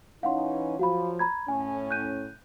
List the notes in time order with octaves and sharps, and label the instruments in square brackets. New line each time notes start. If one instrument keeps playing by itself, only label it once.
[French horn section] E3 C#4 D#4 [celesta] F5 F#5 C6
[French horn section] F3 F#3 [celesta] F#4 F5 B5
[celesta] A#5 B5 G#6
[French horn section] A2 C#4 [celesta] G#5
[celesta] F#6 G6 D#7